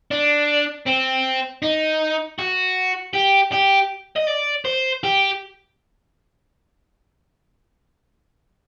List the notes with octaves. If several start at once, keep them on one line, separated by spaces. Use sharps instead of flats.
D4
C4
D#4
F#4
G4
G4
D#5
D5
C5
G4